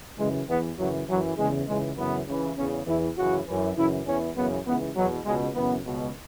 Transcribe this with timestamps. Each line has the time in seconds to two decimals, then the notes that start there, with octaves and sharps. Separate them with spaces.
0.18 F#2 C#3 E3 G#3
0.48 E2 E3 B3
0.78 F#2 C#3 E3 F#3
1.08 F#2 E3 F#3
1.38 E2 C#3 E3 G#3
1.68 C#2 C#3 E3 G#3
1.97 F#2 C#3 E3 B3
2.27 C#2 C#3 E3
2.57 E2 C#3 E3 C#4
2.86 E2 E3 E4
3.17 F#2 C#3 E3 F#4
3.47 F#2 E3
3.76 F#2 C#3 E3 E4
4.06 E2 E3 C#4
4.36 F#2 C#3 E3 B3
4.66 C#2 C#3 E3 B3
4.96 E2 B2 F#3
5.25 C#2 B2 G#3
5.55 F#2 C#3 E3 B3
5.85 C#2 B2